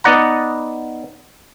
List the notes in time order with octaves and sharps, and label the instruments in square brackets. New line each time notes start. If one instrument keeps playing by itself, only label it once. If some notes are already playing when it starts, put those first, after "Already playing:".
[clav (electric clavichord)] B3 D#4 D5 F#5 A#5